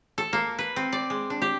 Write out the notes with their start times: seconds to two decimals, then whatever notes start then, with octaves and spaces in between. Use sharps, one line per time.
0.18 A4
0.33 A#3
0.59 B4
0.76 C4
0.92 D5
1.10 G#3
1.30 D4
1.42 G4